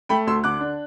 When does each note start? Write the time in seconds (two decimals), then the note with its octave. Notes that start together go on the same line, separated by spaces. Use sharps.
0.09 A3 G5 B5
0.27 D2 C6 E6
0.44 D3 D6 F#6
0.61 D4